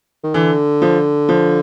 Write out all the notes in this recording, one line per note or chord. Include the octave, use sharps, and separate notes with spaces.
D#3
D3 E3
F3
F3